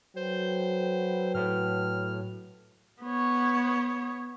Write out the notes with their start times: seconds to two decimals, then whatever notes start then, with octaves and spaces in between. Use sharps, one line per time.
0.17 F#3 A4 B4 C5 G5
1.35 A2 F6
3.03 B3 C#5